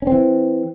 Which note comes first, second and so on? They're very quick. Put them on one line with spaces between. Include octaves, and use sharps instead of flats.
C#4 C4 E3